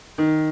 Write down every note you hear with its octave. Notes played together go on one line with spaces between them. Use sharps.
D#3